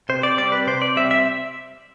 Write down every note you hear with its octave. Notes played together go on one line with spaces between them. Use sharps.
C3 C5
D5
G3 C4 D5
B4
C3 C5
D5
G3 C4 E5
E5